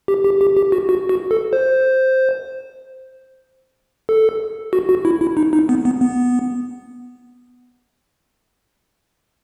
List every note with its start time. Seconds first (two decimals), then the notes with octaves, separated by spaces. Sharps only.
0.08 G4
0.24 G4
0.41 G4
0.57 G4
0.72 F#4
0.89 F#4
1.09 F#4
1.31 A4
1.53 C5
4.09 A4
4.73 F#4
4.89 F#4
5.05 E4
5.21 E4
5.37 D#4
5.53 D#4
5.69 B3
5.85 B3
6.01 B3